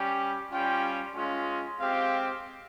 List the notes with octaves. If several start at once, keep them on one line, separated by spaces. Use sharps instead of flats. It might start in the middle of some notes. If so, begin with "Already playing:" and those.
Already playing: G3 C#4 G4
G3 C#4 F4 G5
G#3 C#4 F4
G#3 C4 G4 F5